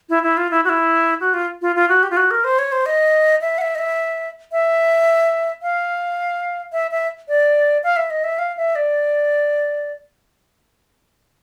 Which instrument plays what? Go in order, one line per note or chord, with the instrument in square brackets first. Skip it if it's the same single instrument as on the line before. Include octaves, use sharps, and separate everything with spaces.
[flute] E4
E4
F4
E4
F#4
E4
F#4
F4
F4
F4
F#4
G4
F4
F#4
A#4
C5
C#5
C5
D#5
E5
F#5
E5
D#5
E5
E5
F5
E5
E5
D5
F5
E5
D#5
E5
F5
E5
D5